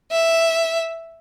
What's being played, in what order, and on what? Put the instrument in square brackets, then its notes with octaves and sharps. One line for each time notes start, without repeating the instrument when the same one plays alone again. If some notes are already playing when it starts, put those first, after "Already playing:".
[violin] E5